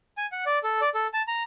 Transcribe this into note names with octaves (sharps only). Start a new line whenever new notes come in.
G#5
F#5
D5
A4
D5
A4
A5
A#5